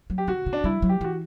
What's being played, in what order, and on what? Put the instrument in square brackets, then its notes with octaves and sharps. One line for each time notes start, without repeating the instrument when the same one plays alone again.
[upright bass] F#3
[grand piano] G4
[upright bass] D3 [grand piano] F#4
[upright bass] C#3
[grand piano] D4
[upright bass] G3 [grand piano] E4
[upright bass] F#3
[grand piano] G4
[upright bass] E3 [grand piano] F#4